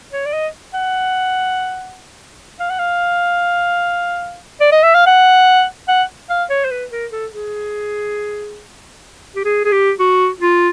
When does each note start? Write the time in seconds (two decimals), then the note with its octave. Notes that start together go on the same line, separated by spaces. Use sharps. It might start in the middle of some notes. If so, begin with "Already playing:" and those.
0.13 C#5
0.26 D5
0.33 D#5
0.74 F#5
2.60 F5
2.70 F#5
2.79 F5
4.60 D5
4.72 D#5
4.83 E5
4.95 F5
5.06 F#5
5.88 F#5
6.30 F5
6.50 C#5
6.65 C5
6.71 B4
6.92 A#4
7.12 A4
7.32 G#4
9.36 G4
9.45 G#4
9.65 G#4
9.72 G4
10.00 F#4
10.41 F4